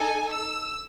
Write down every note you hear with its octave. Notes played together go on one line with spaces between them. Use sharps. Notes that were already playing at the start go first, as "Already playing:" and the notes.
Already playing: D#4 A4 G#5
E6